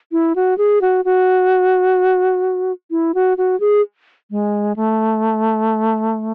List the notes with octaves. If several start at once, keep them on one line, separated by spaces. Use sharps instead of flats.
E4
F#4
G#4
F#4
F#4
E4
F#4
F#4
G#4
G#3
A3